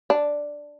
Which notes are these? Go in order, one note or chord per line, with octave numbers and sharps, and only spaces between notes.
D4